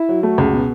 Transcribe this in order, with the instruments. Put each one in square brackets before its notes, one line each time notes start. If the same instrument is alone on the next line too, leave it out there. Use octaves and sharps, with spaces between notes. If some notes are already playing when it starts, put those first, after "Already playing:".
Already playing: [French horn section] E4
[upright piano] F#3
[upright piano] A3 [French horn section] F#4
[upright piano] C#2
B2